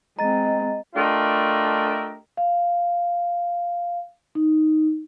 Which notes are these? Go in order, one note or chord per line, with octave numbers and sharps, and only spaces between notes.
G#3 C4 D#5 A#5 A6
A3 D4 F4 G4 A#4 D#5
F5
D#4